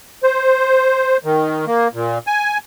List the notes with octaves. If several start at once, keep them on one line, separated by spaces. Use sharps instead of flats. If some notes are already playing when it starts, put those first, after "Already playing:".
C5
D#3
A#3
A#2
G#5